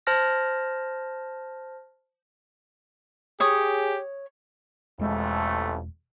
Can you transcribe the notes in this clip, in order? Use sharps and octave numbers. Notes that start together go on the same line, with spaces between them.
C5 A5 F6 A#6
G4 G#4 C#5 D#6
E1 A1 F2 G#3 A3